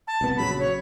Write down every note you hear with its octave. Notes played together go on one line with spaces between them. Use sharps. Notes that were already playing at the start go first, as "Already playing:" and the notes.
A5
C2 B3
A#1 C#3 F#3 B5
C#5